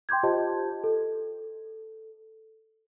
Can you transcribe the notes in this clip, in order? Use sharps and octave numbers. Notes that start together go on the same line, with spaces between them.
G5 C6 D6 G6 G#6
F4 G4 C5 D#5 A5
A4